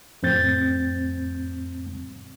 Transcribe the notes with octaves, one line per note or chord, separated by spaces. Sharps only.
F2 A2 C4 G6 A6